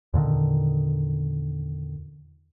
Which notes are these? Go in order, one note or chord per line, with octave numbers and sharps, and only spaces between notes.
E2 A#2 D3 D#3